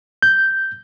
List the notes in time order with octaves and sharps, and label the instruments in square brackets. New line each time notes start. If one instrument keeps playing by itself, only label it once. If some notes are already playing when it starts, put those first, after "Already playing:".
[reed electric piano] G6